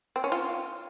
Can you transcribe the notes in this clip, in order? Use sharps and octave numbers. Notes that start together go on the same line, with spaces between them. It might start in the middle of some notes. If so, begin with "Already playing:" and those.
C4
C#4
F4